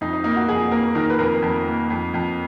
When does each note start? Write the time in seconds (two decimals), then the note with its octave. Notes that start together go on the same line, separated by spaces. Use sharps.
0.01 F2 D#4
0.13 D#4
0.24 A#3 D#4
0.36 F#4
0.48 F2 G#4
0.71 A#3 A#4
0.95 D#3 A#4
1.10 B4
1.19 F2 A#4
1.42 F2
1.67 A#3
1.90 F2
2.14 F2